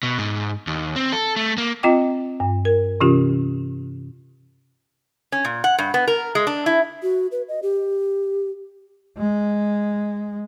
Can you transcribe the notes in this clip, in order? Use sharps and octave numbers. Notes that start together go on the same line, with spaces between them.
B2
G#2
D#2
C4
A4
A3
A#3
C4 F4 D#5 G5 D6
G2
A#4
C3 E3 C#4 F4 G4
C#4
A#2
F#5
G2
B3
A#4
G#3
D4
E4
F#4
B4
D#5
G4
G#3